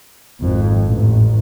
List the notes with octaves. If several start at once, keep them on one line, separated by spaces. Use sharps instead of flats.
G#1 F2
A1